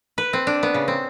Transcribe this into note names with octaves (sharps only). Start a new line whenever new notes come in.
B4
C4
D4
B3
C#3
C4